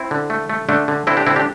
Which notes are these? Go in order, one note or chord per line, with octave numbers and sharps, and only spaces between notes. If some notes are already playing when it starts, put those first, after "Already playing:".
Already playing: C4 E4
D3
A3
A3
D3 A3 D4
D3
D3 C4 E4
D4 G4
D3 C4 E4
D4 G4